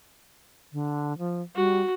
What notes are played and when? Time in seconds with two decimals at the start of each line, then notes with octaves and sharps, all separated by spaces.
0.73 D3
1.18 F3
1.56 G3 F#4